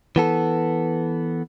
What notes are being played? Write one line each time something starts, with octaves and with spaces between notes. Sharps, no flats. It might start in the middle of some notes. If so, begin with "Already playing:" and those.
E3 B3 A4